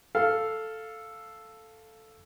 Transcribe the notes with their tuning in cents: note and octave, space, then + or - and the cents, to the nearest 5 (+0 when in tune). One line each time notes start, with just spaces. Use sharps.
A4 +0 F5 +0